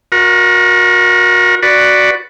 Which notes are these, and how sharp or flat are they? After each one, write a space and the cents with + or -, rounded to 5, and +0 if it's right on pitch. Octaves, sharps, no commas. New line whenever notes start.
F#4 -30 A#4 +25
F#4 +0 B4 +0 D5 +0